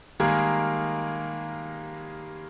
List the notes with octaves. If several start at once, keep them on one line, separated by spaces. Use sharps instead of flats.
D#3 G3 G#3 A#3 G#4 A#4